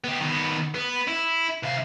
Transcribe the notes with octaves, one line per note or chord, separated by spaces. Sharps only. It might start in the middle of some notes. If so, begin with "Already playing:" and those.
B3 G4
D#3 B3
B3
E4
C3 F5